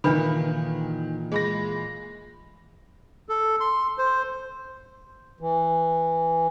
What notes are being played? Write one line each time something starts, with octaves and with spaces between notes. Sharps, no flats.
A#2 D#3 E3 D4 A4 B4 B5
G#3 G#4 B5 A#6
A4
C6
C5
E3